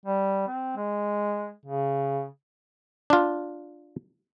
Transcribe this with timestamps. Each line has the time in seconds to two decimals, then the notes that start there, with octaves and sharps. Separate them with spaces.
0.06 G3
0.48 C4
0.76 G#3
1.66 C#3
3.10 D4 F4